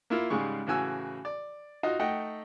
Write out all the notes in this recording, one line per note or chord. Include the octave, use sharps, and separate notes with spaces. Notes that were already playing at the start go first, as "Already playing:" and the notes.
A#3 E4 F4
G#2 C#3 G3 G#3 C#6
A2 C#3 E3 F#4 G#5 E6
D5
D#4 F4 F#4 D#5
A3 D#4 D#5 F#5 G5